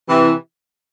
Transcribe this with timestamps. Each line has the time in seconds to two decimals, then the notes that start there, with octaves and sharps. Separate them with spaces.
0.08 C3 E3